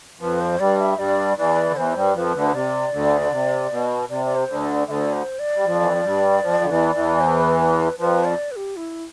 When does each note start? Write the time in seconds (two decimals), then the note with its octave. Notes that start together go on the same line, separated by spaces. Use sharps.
0.21 F2 F3 B4
0.41 C5
0.59 G2 G3 D5
0.79 E5
0.98 G2 G3 D5
1.37 E2 E3 D5
1.70 D3
1.76 E2 E3 C5
1.96 G2 G3
2.15 F2 F3 B4
2.35 D2 D3
2.54 C3 D5
2.93 D2 D3
3.21 D3
3.32 C3
3.70 B2
4.09 C3 D5
4.25 D5
4.35 C5
4.49 D2 D3
4.62 D5
4.87 D2 D3 D5 E5
5.13 C5
5.39 D5
5.56 G3
5.66 F2 F3
5.82 E3
5.93 F3
6.04 G2 G3
6.43 F2 F3
6.64 D3
6.69 E2 E3
6.95 E2 E3
7.20 C5
7.41 B4
7.60 B4
7.79 B4
7.99 F2 F3 B4
8.24 D5
8.51 B4
8.56 G4
8.76 E4